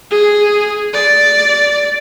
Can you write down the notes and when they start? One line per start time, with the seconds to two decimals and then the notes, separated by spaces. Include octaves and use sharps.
0.11 G#4
0.93 D5